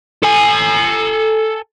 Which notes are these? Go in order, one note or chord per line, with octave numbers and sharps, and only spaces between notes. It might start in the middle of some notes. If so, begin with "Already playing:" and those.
A4 G#5